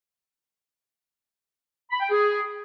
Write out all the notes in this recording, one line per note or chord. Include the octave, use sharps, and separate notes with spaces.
B5
G5
G#4